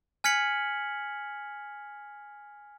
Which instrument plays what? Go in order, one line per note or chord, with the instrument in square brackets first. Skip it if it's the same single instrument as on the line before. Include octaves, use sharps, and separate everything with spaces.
[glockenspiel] G#5 F6 G#6 B6 C#7 F#7